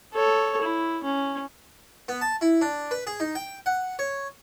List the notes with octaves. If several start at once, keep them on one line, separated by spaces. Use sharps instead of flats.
A4 C#5
E4
C#4
B3
A5
E4
D4
B4
G#4
D#4
G5
F#5
C#5